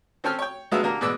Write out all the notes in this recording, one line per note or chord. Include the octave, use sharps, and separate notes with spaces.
C4 C#4 A4 G5 F6
C#5 G5
F#3 G#3 B3 D4 F4 E5
D3 A#3 G4 A#4
G#2 B2 E3 D5 E6